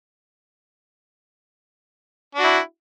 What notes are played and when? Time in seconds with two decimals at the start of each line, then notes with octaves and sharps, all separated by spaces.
2.35 D4
2.39 F#4
2.43 E4